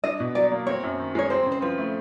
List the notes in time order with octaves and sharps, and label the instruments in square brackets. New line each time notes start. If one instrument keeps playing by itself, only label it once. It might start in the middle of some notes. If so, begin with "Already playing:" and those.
[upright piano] D4 [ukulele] D#5
[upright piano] B2
[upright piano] F#3 [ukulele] D5
[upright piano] A#3
[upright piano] C4 [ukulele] C#5
[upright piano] F#2
D#3
[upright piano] G#3 [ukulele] C#5
[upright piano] C4 [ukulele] C5
[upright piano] C#3
[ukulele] C5
[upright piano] F3 [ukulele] B4
[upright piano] A3